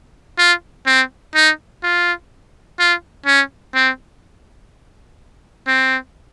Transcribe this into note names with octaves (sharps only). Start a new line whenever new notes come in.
F4
C4
D#4
F4
F4
C#4
C4
C4